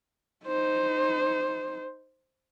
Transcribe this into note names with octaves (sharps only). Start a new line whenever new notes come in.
D#4 C5